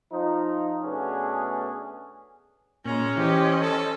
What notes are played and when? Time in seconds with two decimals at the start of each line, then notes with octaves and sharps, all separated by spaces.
0.11 F3 D#4
0.83 B2 A3 B3 C#4 D4 G#4
2.86 A#2 G#3 C#4 A#5
3.17 E3 G4 C5 D#5
3.61 A4